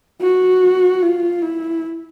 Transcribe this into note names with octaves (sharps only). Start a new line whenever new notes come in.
F#4
F4
E4